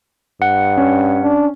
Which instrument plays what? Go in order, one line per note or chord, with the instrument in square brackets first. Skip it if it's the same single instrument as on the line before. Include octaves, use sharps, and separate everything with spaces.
[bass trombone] G2 [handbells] F#5
[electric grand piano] C#4
[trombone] D4